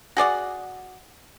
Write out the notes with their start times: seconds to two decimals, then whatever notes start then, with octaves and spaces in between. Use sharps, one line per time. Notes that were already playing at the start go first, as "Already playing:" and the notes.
0.17 F#4 G#4 D5 F#5